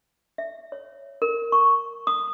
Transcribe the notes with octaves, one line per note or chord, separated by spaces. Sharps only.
E5
C#5
A#4
C#6
D#6